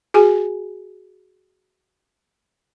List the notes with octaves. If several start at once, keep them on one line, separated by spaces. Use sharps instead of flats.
F#4 G#4 G#5